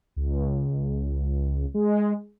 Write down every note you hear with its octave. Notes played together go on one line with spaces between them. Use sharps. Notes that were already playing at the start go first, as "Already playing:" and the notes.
C#2
G#3